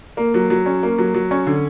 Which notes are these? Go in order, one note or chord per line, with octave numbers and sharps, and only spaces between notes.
A#3
F#3
F#3
C#4
A#3
F#3
F#3
C#4
D3